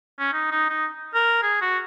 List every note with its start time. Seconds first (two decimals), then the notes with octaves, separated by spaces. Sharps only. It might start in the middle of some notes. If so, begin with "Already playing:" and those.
0.19 C#4
0.33 D#4
0.51 D#4
0.69 D#4
1.14 A#4
1.43 G#4
1.61 F#4